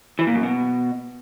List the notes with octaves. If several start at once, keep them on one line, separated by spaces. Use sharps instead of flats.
E3
A#2
F#2
B2